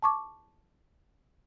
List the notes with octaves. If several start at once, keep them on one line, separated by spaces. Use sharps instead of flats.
A5 C#6 D6